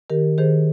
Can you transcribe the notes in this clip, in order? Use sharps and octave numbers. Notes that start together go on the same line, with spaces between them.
D#3 G4 A#4
D#3 G#4 C5